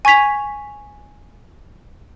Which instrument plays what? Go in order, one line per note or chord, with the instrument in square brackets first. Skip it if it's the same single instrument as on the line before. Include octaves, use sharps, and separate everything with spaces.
[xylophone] G#5 C#6 G#6 B6 F7